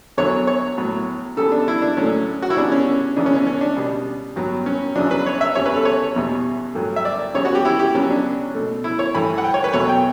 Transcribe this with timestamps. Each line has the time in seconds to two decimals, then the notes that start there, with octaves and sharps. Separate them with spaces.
0.17 E2 D3 F#3 B3 C#5
0.47 C#5
0.78 A2 F#3 B3
1.37 C#3 G3 B3 A4
1.52 D4
1.68 E4
1.82 D4
1.97 A2 F#3 A3 C#4
2.42 F#4
2.50 E4
2.57 C#3 G3 B3 D4
2.72 C#4
3.16 C#3 E3 B3 D4
3.26 C#4
3.37 C#4
3.47 C#4
3.61 D4
3.77 B2 G3 B3
4.36 G2 F#3 B3
4.66 C#4
4.96 E2 C#3 F#3 D4
5.11 B4
5.26 C#5
5.41 E5
5.55 E2 C#3 G3 C#5
5.66 B4
5.76 A4
5.85 C#5
6.16 E2 B2 G3 B3
6.75 G2 F#3 A3
6.96 E5
7.05 D5
7.35 C#3 G3 B3 C#5
7.45 F#4
7.55 G4
7.65 E4
7.79 G4
7.94 C#3 F#3 B3 C#4
8.10 D4
8.55 B2 A3
8.84 E4
8.99 C#5
9.14 G2 E3 A3 B5
9.38 F#5
9.44 G5
9.54 C#5
9.64 B4
9.73 E2 B2 F#3 A3 C#5
9.89 G5